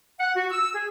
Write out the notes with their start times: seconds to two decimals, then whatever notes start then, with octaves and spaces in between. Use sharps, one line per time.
0.20 F#5
0.37 F#4
0.51 E6
0.75 G#4